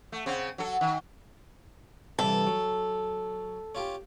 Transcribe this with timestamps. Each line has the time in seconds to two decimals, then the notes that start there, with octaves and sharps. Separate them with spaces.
0.12 A3
0.26 C#3 C4
0.58 F#3 A4
0.81 D#3
2.19 G2 C3 E3 A4
2.47 F#3
3.75 C#4 F4 G4